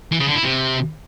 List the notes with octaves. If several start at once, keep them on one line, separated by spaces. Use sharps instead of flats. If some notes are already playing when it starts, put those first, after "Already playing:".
E3
C#3
D3
E4
C3